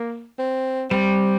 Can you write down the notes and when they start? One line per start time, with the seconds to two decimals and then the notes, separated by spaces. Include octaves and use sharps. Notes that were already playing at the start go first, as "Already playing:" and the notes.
Already playing: A#3
0.39 C4
0.91 G3 C4